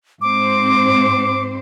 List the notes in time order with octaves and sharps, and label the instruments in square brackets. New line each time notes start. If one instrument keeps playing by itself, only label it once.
[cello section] G#2 C4 C5 [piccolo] D6